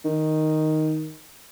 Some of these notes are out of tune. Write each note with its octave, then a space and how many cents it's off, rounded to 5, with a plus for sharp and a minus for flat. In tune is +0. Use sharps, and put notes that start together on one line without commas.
D#3 +0